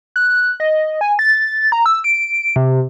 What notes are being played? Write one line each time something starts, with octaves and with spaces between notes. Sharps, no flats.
F#6
D#5
G#5
A6
A#5
E6
D7
C3